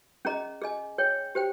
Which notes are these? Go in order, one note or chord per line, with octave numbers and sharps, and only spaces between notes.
C#4 G#4 D#5 A#5
G#4 D#5 G#5
G#4 C#5 G5
G4 C5 G5